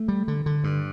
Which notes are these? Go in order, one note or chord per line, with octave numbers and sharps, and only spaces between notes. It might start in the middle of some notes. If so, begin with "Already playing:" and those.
Already playing: A3
G3
D3
D3
G2